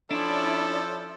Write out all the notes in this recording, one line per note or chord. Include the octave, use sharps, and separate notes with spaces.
F3 C#4 D4 E4 A4 D5